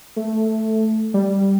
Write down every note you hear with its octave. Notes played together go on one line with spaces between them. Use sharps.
A3
G3